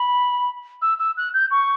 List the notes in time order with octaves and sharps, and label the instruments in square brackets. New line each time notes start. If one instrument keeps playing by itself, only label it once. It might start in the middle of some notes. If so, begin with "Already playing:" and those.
Already playing: [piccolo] B5
E6
E6
F#6
G6
C#6